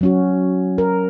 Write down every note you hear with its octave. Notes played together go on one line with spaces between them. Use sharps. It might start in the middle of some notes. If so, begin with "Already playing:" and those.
F#3 C#4 F#4
A#4